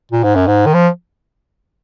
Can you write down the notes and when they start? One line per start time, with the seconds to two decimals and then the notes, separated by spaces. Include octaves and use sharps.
0.12 A#2
0.23 G#2
0.35 F#2
0.47 G#2
0.66 D#3
0.74 F3